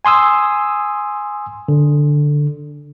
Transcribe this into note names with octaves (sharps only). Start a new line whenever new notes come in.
G#5 C6 D#6 E6
D3